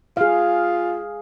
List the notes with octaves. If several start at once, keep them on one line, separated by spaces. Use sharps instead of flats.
F4 G#4 F5